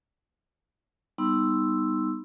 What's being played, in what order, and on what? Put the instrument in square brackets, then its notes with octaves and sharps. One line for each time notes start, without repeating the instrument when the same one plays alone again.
[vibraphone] G3 B3 D#4 C6 E6